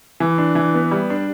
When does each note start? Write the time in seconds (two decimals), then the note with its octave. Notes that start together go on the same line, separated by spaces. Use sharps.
0.20 E3
0.38 D4
0.55 E3
0.74 B3
0.91 G3
1.10 D4